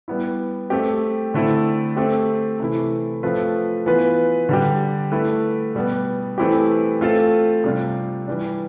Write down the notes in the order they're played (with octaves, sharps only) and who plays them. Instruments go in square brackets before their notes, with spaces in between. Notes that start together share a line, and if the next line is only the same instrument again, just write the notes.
[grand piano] G3 B3 E4
A3 C4 G4
D3 A3 C4 E4 A4
A3 C4 G4
C3 E3 A3 E4
F3 A3 C4 F4 B4
E3 B3 F4 B4
D3 G3 D4 G4
A3 E4 B4
B2 G3 B3
E3 A3 C4 E4 G4
A3 C4 F4 A4
C3 G3 D4 F4
E3 G3 D4